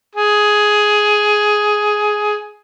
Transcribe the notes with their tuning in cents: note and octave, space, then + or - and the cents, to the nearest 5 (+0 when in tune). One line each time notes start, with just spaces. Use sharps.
G#4 +10